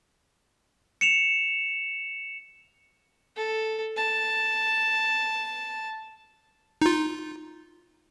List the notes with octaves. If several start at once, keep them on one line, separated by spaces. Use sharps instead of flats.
C#7 E7 F7
A4
A5
D#4 F4